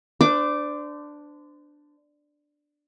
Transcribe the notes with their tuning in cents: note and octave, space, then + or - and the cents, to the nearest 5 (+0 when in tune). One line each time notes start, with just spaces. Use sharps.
D4 +5 C5 -30 D6 +0